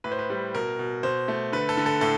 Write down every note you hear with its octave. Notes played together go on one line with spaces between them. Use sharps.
A2 B4
C5
B4
G3
B2 A#4
B2
B2 C5
A3
D3 B4
A4
D3
A4
A2 A4